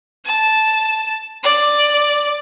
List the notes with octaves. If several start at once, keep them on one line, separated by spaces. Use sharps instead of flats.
A5
D5